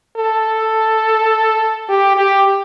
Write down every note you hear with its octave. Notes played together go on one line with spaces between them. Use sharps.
A4
G4
G4